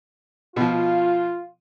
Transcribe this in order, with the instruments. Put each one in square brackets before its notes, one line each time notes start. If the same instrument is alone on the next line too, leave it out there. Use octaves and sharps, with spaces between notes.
[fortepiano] B2 F3 [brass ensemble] F4